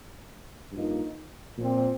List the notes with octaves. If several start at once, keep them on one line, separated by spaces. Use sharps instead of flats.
G2 F3 A#3 D#4
A#2 F3 C4